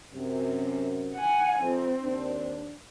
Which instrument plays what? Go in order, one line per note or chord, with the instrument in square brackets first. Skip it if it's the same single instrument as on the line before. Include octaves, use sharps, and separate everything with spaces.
[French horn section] F#2 C3
[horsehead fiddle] F#5 G#5
[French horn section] F2 [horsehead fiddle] C4
[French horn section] D#2 D4